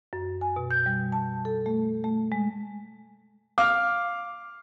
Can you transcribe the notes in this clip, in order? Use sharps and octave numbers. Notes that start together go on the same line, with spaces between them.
F#2
G#5
B2
G6
G3
A5
A4
A3
A3
G#3
F5 D6 F6